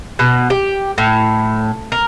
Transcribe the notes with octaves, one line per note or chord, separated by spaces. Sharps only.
B2
G4
A2
A#4